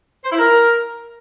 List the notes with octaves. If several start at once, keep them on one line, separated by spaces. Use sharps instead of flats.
C5
E4
A#4